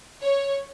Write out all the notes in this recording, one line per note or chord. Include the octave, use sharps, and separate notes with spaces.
C#5